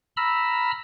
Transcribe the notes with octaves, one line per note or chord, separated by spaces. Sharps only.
A#5 B5 E6 F6